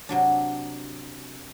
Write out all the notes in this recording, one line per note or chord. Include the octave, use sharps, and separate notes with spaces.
C3 F#3 D4